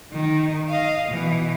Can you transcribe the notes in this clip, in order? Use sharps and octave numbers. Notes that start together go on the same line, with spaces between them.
D#3
D#5 F5
B2 E3